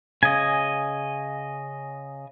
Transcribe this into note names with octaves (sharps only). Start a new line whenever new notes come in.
C#3 D#5 G#5